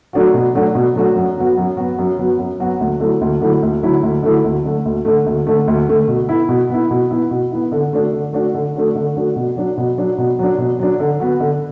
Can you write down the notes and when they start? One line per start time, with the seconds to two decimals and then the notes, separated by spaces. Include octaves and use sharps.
0.13 F#3 A3 D4 F#4
0.34 B2
0.55 F#3 A3 D4 F#4
0.75 B2
0.95 F#3 A3 D4 F#4
1.15 F#2
1.37 F#3 B3 F#4
1.58 F#2
1.77 F#3 B3 F#4
1.99 F#2
2.19 F#3 B3 F#4
2.39 F#2
2.60 F#3 B3 F#4
2.80 D2
3.00 D3 F#3 A3 E4
3.21 D2
3.41 D3 F#3 A3 E4
3.63 D2
3.82 D3 F#3 A3 E4
4.03 D2
4.23 D3 F#3 A3 E4
4.44 D2
4.65 D3 A3
4.85 D2
5.05 D3 A3
5.26 D2
5.47 D3 A3
5.68 D2
5.88 D3 A3
6.08 B2
6.28 B3 E4
6.49 B2
6.70 B3 E4
6.91 B2
7.11 B3 E4
7.31 B2
7.52 B3 E4
7.72 D3
7.93 A3 D4 F#4
8.13 D3
8.33 A3 D4 F#4
8.54 D3
8.75 A3 D4 F#4
8.96 D3
9.16 A3 D4 F#4
9.36 B2
9.57 F#3 D4
9.77 B2
9.98 F#3 D4
10.18 B2
10.39 F#3 D4
10.58 B2
10.79 F#3 D4
11.00 D3
11.20 B3 F#4
11.40 D3